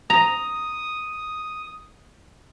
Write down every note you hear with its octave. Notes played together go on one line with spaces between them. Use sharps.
A#5 D#6